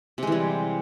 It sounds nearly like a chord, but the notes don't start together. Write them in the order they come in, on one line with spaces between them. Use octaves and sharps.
C3 G#3 E3 G3